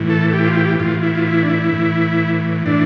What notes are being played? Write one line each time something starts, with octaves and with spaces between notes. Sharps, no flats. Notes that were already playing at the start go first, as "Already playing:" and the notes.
Already playing: A2 E3
A4
G4
F4
G4
A2 E3 F4
E4
F4
E4
D4
E4
A2 E3
A2 E3 D4